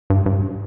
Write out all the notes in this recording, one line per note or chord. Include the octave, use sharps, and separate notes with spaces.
G2
G2